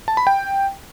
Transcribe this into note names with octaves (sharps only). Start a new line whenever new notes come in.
A5
B5
G5